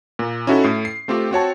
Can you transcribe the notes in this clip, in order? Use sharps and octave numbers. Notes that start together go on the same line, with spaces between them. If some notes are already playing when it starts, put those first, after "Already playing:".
A#2
C#4 D#4 E4 F#4 A4
A2 C7
C7
A3 C4 F4 G4
C4 F#4 C#5 A5